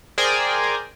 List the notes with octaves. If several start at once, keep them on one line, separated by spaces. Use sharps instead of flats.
G#4 A#4 C5 D5 G5 G#5